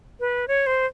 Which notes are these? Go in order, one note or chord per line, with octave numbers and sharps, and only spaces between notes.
B4
C#5
C5